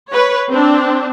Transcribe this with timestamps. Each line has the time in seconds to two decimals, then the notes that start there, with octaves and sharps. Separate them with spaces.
0.11 B4 C#5
0.50 C4 D4